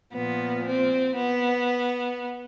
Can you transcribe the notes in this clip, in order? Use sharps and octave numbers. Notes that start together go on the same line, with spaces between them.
A#2 F3 B3
C4
B3